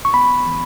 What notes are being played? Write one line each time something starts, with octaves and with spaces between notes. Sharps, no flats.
C#6
B3 B5
E3